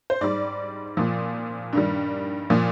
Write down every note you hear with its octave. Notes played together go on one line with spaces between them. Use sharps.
C5
G#2 G3 D5
A#2 F3
G2 D#3 G3
A#2 F3